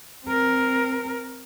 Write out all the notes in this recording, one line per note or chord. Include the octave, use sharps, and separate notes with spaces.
C4 A#4